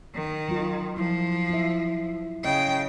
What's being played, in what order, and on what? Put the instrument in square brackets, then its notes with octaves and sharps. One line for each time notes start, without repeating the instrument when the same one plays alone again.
[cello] D#3
[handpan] F#3 F4
[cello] F3 [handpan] E4
[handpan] E4 E5
[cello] C#3 G5 [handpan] D#5